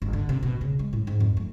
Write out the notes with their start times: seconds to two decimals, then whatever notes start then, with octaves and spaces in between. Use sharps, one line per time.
0.02 G1
0.13 D3
0.29 C3
0.43 B2
0.61 C#3
0.79 G#3
0.93 A2
1.07 G#2
1.20 F2
1.37 A3